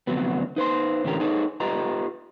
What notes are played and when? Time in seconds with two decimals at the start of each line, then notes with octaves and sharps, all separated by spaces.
0.07 D2 C3 D#3 F3 F#3 B3
0.56 D#4 B4 C5 C6
1.04 A2 D3 E3 C#4 G4 A#4
1.20 D#4 G#4 A4 B4 C#5
1.60 F4 G4 B4 D#5 A#5